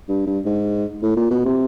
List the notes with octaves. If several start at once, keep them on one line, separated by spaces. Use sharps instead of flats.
G2
G2
G#2
A2
A#2
B2
C3